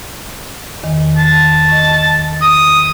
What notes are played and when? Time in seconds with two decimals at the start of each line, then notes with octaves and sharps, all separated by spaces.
0.83 E2 D#3
1.17 A5
1.68 D#5 C#6
2.42 D#6